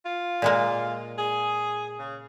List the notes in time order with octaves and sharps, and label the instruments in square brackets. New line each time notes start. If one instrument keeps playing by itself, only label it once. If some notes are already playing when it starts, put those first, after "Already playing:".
[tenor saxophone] F4
[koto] A#2 G#3 A#3
[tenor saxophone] G#4
C#3